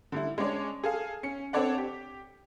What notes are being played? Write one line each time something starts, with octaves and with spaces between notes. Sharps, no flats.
D3 G3 E4
G#3 C#4 D4 C#5 D5
G#4 A4 F5
C#4 C#7
C4 D4 A4 C#5 D5 F#5
G4